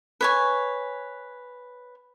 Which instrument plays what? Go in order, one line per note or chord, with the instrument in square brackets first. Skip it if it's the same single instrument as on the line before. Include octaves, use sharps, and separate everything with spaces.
[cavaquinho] B4 C#5 G#5